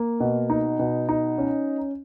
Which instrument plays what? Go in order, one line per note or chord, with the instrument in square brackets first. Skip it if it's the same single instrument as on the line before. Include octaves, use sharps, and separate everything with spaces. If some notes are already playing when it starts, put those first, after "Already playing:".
Already playing: [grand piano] A#3
B2
D#4
B2
D#4
C#4